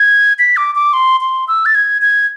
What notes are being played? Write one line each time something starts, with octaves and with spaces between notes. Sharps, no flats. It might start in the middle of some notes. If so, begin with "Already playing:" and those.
Already playing: G#6
B6
D6
D6
C6
C6
E6
A6
G#6
G#6